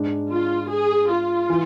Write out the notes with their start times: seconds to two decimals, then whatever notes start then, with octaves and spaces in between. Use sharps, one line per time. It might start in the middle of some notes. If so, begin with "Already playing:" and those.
Already playing: G#2 G#3 D4
0.31 F4
0.71 G#4
1.10 F4
1.50 E3